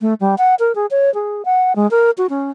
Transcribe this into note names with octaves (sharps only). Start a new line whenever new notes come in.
A3
G3
F#5
A#4
G#4
C#5
G#4
F#5
G#3
A#4
F#4
C#4